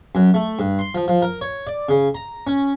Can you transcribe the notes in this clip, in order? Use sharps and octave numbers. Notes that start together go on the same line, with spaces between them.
F#2
A3
G2
C6
F3
F3
A#4
C#5
D5
C#3
A#5
C#4